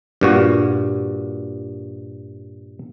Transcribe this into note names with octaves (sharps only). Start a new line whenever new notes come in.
G2 A#2 F#4